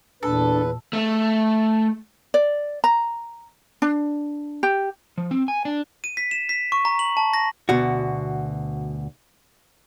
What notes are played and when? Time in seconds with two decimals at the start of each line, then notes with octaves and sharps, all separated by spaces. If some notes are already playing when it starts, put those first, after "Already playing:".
0.23 E2 A#2 D4 A4 B4
0.93 A3
2.34 D5
2.84 A#5
3.82 D4
4.63 G4
5.18 F3
5.31 C4
5.48 G#5
5.65 D4
6.04 D#7
6.17 B6
6.31 E7
6.49 B6
6.72 C#6
6.85 A#5
6.99 F#7
7.17 A5
7.34 A#6
7.69 D2 B2 F#4